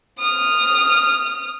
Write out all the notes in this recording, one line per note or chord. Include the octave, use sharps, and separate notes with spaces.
D#6 F6